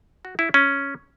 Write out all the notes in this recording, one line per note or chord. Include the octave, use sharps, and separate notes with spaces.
F#4
E4
C#4